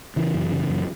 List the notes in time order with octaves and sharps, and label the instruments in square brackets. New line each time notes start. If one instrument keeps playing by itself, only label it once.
[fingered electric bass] C#3 E3
F#2
C#3
F#2